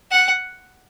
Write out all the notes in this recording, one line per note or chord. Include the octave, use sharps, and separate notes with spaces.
F#5